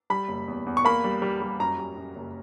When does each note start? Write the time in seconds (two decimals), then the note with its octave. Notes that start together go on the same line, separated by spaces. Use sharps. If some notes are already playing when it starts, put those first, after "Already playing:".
0.10 G3 B5
0.28 F#1
0.48 E2
0.66 E2
0.77 C#6
0.85 A#3 B5
1.04 G3
1.22 G3
1.42 G3
1.60 F#2 A#5
1.78 G3
1.97 F#2
2.16 F#1